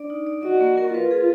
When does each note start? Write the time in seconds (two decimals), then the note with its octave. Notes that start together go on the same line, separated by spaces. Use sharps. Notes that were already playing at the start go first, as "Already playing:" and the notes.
Already playing: D4 D5
0.10 D#4
0.27 D5
0.43 F#4 D#5
0.61 A#3
0.78 A#4
0.93 F4 B4
1.11 G#4